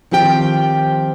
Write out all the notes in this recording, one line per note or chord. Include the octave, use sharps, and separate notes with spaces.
D#3 F3 C4 G4 G5